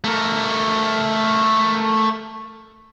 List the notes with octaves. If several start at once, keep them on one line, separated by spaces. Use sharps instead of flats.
A3 A#4